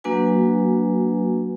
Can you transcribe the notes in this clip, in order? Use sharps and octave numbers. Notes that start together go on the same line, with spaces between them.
F#3 A#3 D4 F#4 B4 G#5